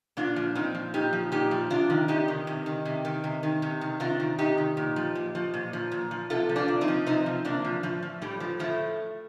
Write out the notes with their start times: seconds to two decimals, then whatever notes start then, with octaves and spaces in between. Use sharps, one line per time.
0.17 A#2 D4 F4
0.36 F3
0.55 A#2 C4 D#4
0.75 F3
0.94 A#2 D#4 G4
1.13 F3
1.32 A#2 D#4 G4
1.51 F3
1.70 C3 D4 F4
1.90 D#3
2.08 C3 D#4 G4
2.28 D#3
2.47 C3
2.66 D#3
2.85 C3
3.05 D#3
3.24 C3
3.43 D#3
3.62 C3
3.81 D#3
4.00 C3 D4 F4
4.20 D#3
4.39 C3 D#4 G4
4.58 D#3
4.77 A#2
4.96 F3
5.15 A#2
5.35 F3
5.54 A#2
5.73 F3
5.92 A#2
6.11 F3
6.30 C3 F4 A4
6.49 F3
6.56 D4 F4
6.68 C3
6.81 C4 D#4
6.88 F3
7.06 C3 C4 D#4
7.26 F3
7.45 C3 A#3 D4
7.65 F3
7.83 A2 F3
8.03 F3
8.22 A2 G3
8.40 F3
8.59 A2 F3 A3